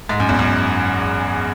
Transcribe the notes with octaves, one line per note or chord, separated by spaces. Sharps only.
G#2
F#2
E2
F#2